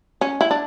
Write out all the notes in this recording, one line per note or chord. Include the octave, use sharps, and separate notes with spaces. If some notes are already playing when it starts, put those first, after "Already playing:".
C#4
E4
D4